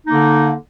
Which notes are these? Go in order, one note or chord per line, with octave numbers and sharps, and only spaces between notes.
D3 A#3 D#4